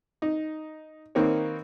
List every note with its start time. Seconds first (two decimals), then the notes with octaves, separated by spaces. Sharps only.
0.22 D#4
1.15 D#3 A#3 C4 D#4 B4 C#5